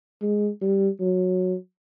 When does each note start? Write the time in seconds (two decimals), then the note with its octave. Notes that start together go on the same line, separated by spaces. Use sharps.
0.22 G#3
0.61 G3
1.00 F#3